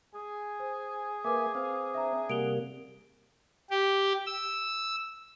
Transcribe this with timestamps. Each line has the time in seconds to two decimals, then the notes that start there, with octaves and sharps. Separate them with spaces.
0.15 G#4 G#5
0.60 C5
1.25 A#3 B4 E5 G#5 D6
1.55 C4 F5
1.94 D4 E5 A#5
2.30 C3 G3 A#3 F#5 D7 F7 G7
3.70 G4
4.27 E6